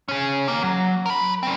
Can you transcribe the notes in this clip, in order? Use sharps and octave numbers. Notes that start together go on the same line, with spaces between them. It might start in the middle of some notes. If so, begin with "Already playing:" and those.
C#4 G#4
D#3 A#3
F#3
A#4 B5
C4 C#4